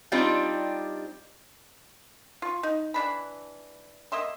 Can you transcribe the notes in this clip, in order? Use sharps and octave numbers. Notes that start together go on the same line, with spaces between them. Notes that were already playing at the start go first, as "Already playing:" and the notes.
G3 C4 D4 D#4 F4 G4
F4 C#6
D#4
E3 D4 B5
A#3 D#5 E5 C6